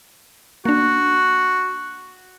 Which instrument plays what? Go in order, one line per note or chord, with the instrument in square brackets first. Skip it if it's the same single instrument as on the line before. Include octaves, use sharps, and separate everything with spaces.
[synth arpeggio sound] A#3 D4 [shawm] F#4